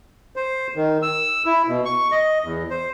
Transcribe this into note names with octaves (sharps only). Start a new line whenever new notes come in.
C5
D#3
E6
E4
B2
C#6
D#5
E2
C5